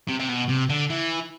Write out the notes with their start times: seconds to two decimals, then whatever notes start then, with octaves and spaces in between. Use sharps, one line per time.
0.08 C3
0.20 C3
0.28 B2
0.49 C3
0.70 D3
0.90 E3